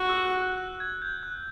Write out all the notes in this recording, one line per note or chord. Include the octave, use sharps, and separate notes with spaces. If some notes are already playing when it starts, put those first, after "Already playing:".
Already playing: F#4
E6
F#6
F#6
F#6
G#6
G6
F#6